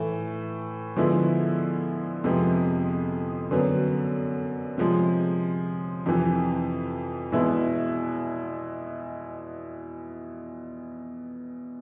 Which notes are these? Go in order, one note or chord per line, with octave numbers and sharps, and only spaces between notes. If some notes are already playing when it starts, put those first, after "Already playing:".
Already playing: A2 E3 A3
D3 F3 G#3 B3 E4
F2 C3 F3 G#3 B3
F#2 D3 F#3 B3
C3 F3 G#3
F2 C3 E3
E2 B2 G#3 B3 E4